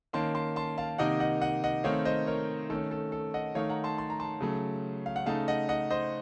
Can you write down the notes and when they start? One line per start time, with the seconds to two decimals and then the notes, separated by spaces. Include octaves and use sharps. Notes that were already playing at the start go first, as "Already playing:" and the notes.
0.13 D#3 A#3 C#4 A5 C6
0.35 A5 C6
0.56 A5 C6
0.78 F5 A5
0.98 C3 D#3 A#3 D#4 D#5 F#5
1.20 D#5 F#5
1.41 D#5 F#5
1.64 D#5 F#5
1.84 D#3 A3 C4 D#4 C#5 F5
2.05 C5 D#5
2.27 A#4 C#5
2.70 D#3 A3 C#4 A4
2.91 A4
3.12 A4
3.34 D#5 F#5
3.55 D#3 A3 D#4 C#5 F5
3.70 F#5 A#5
3.84 A5 C6
3.98 A5 C6
4.10 A#5
4.20 A5 C6
4.40 C#3 F#3 A3
5.06 F5
5.16 F#5
5.26 C#3 A3 D#4 F5 A5
5.48 D#5 F#5
5.69 D#5 F#5
5.91 C5 D#5